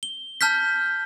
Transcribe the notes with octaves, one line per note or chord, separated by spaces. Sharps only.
G7
A5 F6 G6 B6